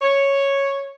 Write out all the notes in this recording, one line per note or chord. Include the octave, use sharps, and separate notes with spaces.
C#5